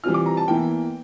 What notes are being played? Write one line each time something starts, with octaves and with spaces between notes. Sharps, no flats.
E3 G3 C4 F4 F6
D6
A#5
A5
E2 E3 A#3 E4 G5